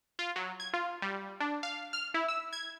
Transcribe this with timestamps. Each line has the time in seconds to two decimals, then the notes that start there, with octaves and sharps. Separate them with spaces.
0.19 F4
0.36 F#3
0.60 G#6
0.73 F4
1.02 G3
1.40 D4
1.63 F5
1.93 F6
2.14 E4
2.28 E6
2.53 G#6